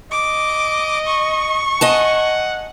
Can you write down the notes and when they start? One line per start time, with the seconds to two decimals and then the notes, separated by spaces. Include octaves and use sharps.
0.11 D#5 D6
1.06 C#6
1.81 D#5 F#5 G#5 A5